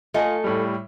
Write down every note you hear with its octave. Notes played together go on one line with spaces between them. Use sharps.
A3 F4 D#5 G#5
A2 G3